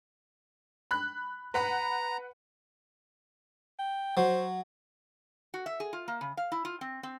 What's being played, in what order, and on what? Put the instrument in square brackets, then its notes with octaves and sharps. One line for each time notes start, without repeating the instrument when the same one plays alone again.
[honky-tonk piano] B5 F#6
[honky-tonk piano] B4 F#5 B5 [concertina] A#5
[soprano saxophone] G5
[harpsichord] F#3 [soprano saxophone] C5
[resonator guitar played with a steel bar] F#4
E5
G#4
F4
A#3
C#3
F5
E4
F4
C4
C4